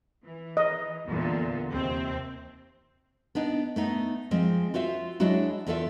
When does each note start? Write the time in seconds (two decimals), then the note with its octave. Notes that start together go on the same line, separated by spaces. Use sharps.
0.25 E3
0.57 D#5
1.06 E2 A#2 D3
1.71 D#2 C3 C4
3.35 B3 D4 D#4
3.76 A3 B3 D#4
4.31 F3 G#3 C4
4.74 F4 F#4 C5 E5
5.20 F#3 G#3 D4 E4 F#4
5.67 E2 F4 A4 D5 E5